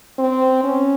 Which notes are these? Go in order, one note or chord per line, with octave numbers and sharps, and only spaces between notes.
C4
C#4